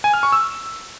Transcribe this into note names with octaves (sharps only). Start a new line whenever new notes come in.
G#5
F6
C#6
E6